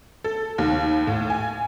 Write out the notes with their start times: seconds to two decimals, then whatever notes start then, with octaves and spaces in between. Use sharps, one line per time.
0.24 A4
0.58 D#2
1.07 A2
1.30 G#5